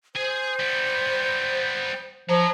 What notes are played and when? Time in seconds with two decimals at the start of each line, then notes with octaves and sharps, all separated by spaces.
0.15 G#4 C5 G#5
0.59 G3 B3
2.30 F3 C#5 A#5